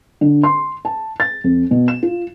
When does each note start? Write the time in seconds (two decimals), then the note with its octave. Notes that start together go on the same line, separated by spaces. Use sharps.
0.21 D3
0.43 C6
0.85 A5
1.20 A6
1.44 F2
1.71 B2
1.88 E7
2.03 F4